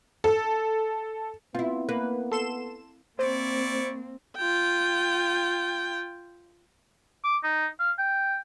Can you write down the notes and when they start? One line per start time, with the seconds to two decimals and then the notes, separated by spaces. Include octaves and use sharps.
0.24 A4
1.55 B3 C4 E4 F4
1.89 A#3 B4
2.32 A4 C6 E7
3.19 A#3 C4 E4 C5 D5 C#6
4.37 F4 G5
7.24 D6
7.43 D#4
7.80 F5
7.99 G5